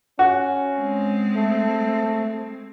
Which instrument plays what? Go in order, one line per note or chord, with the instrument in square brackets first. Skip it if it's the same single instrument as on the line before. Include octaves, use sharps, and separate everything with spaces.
[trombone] C#4 [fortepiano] F#4
[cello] G#3 C4
[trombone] A3